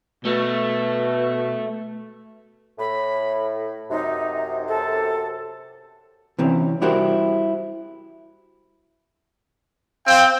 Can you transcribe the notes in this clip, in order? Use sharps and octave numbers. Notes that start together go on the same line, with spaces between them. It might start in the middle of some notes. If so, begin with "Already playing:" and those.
B2 A3
A2 B5
F#2 C3 D#4
A4
C3 E3 C4 C#4
G3 E4 F#4 G4 A#4 C5
C4 F5 G5